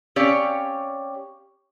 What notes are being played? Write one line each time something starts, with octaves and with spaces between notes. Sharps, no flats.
C4 C#4 G4 C#5 D5 F5